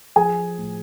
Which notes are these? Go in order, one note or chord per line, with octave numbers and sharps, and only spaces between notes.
F3 G#4 G#5
A2